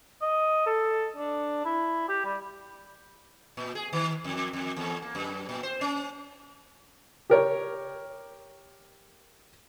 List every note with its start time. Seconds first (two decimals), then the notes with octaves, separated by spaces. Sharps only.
0.22 D#5
0.66 A4
1.17 D4
1.65 E4
2.09 G4
2.25 G3
3.57 A#2
3.75 G#4
3.93 D#3
4.24 F2
4.53 F2
4.77 E2
5.02 A#3
5.15 F#2
5.49 A#2
5.63 C5
5.81 C#4
7.30 G4 A#4 C#5